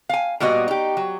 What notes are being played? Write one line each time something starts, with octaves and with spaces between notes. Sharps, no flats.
F5 G#5
A#2 G3 B3 F#4 D#5
D#4 G4
F#3